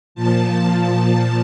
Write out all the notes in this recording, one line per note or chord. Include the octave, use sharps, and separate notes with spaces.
A#2 F3 A5
A5